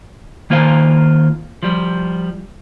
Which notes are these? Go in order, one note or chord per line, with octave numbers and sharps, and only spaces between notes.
D#3 A#3 F4 C5 F5
F3 G3